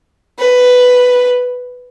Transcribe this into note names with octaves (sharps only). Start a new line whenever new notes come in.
B4